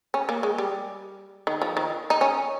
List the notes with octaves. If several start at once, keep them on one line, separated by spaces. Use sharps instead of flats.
C#4
A#3
G#3
G3
D#3
F3
D#3
D#4
C#4